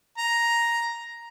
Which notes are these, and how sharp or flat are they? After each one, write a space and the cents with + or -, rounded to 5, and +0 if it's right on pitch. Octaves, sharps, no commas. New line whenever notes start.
A#5 +5